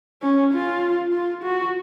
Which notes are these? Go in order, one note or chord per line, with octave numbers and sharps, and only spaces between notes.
C#4
F4
F4
F#4